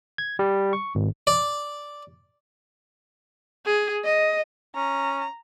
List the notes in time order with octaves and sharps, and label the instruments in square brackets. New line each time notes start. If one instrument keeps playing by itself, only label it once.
[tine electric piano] G#6
G3
C#6
G#1
[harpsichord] D5
[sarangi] G#4
D#5
[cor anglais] C#4 [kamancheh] A#5